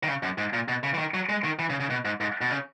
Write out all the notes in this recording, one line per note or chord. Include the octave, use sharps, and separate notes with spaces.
D#3
C#3
F#2
G#2
A#2
B2
C#3
E3
D#3
F#3
G#3
D#3
E3
C#3
C#3
B2
G#2
G#2
B2
C#3